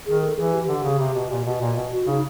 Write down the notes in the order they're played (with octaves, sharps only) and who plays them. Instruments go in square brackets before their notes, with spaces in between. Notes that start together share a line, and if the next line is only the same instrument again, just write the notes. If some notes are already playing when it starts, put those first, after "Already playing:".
[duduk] D#3 [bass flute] G#4
[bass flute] A4
[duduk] E3 [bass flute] G#4
[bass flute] G4
[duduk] D3 [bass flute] G4
[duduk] C#3
C3
B2
A#2
B2
A#2
B2
[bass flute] F#4
[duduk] C#3 [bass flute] D#4